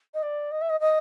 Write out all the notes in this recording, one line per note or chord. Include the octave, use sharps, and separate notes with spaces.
D#5
D5
D#5
E5
D#5
D#5